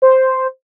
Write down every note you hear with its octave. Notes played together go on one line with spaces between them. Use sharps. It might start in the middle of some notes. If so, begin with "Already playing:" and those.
C5